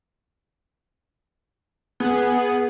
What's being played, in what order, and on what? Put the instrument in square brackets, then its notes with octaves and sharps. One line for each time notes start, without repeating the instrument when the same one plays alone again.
[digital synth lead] B3 [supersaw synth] G#4